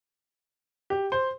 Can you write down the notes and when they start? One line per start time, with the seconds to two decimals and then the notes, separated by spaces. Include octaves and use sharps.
0.90 G4
1.12 C5